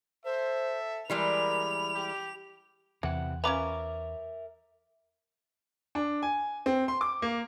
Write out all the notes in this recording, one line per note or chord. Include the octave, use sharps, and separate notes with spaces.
A4 C5 E5
E3 G3 G#3 A#4 B5 F7
G4
E2 C3 E3 F#5
C#4 F4 A#4 B4 E5 A#5 D6
D4
G#5
C4
C6
D6
A#3